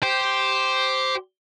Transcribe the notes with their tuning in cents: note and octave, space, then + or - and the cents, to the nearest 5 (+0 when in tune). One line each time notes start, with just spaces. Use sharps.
G4 -5 C5 +0